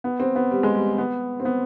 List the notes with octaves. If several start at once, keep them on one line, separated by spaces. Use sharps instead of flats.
B3
C4
B3
G3
G#3
G3
B3
C4
B3